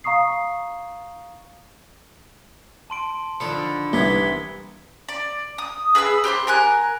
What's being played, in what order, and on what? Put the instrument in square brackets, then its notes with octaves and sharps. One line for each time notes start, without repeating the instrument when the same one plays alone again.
[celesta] F5 A#5 C#6 D#6 C7
[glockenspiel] A5 C6 D7
[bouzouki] D3 D#3 D4 [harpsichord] F3 A4 [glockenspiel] B5 C#7
[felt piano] C2 [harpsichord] E3 A#3 B3 [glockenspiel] G#6 B6 G7
[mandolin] D5
D#6
G#4 B4 B5 E6
G4 C5 B5 F#6
A#4 G#5 F#6